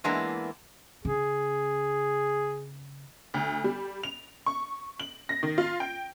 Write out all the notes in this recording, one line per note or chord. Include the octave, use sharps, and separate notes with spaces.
E3 G#3 A#3 B3 D4 E4
C#3 G#4
D2
G3
F7
C#6
F#7
A#6
D#3
F4
G5